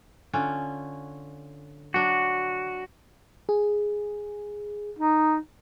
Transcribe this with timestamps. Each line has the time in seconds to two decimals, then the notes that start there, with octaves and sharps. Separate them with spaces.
0.33 D3 C#4 F4
1.94 F#3 D4 F#4
3.49 G#4
4.99 D#4